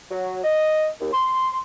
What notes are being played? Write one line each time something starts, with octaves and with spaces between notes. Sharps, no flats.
F#3
D#5
D#2
C6